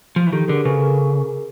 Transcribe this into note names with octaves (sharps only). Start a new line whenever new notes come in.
F3
E3
D#3 G4 A4
D3 G#4 A#4
C#3 A4 B4
G#4 A#4